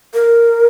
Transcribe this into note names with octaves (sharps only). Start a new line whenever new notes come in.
A#4